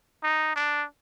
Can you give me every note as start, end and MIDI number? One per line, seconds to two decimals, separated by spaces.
0.23 0.51 63
0.56 0.85 62